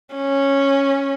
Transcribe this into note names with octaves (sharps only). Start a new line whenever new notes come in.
C#4